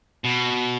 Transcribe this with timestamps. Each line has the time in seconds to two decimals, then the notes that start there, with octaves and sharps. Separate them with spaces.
0.24 B2